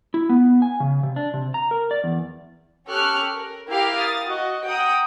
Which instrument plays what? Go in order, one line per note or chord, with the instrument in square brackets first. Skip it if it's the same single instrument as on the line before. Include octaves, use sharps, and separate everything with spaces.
[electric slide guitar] E4
B3
G#5
C#3
C3
D4
C3
A#5
A#4
D5
E2
[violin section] C#4 G4 A4 C#6 F6 F#6
A#4
E4 G4 A#4 F5
D#6 A6
F#4 D#5
F#5 G5 A#5 D#6